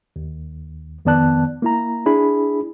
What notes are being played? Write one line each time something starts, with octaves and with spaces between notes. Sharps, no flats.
D#2
F2 D#3 B3 D5 A5 F#6
A#3 E4 A#5
D4 E4 G#4 B5